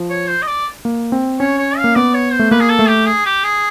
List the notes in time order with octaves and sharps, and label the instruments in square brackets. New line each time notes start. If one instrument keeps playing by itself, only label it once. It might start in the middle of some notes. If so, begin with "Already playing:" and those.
Already playing: [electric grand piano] F3
[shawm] C#5
C5
D#5
D5
[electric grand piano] A#3
C4
[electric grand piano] C#4 [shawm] C#5
[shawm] C#5
F5
[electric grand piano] A#3
[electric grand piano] B3 [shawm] D5
[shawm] C#5
C5
[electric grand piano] A3
[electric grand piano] A#3 [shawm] B4
[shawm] G#4
A4
[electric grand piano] A3
[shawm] G4
G#4
G4
G#4